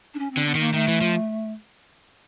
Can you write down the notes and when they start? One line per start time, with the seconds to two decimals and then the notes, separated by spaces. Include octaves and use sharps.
0.14 D4
0.19 C#4
0.32 C4
0.37 D3
0.46 B3
0.55 D#3
0.60 A#3
0.73 D#3 A3
0.88 E3
1.01 F3